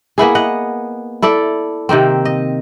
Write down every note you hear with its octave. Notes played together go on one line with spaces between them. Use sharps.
A#3 B3 E4 G#4
D#5 F#5
E4 A4 D5
C3 D#3 A#3 C4
D#5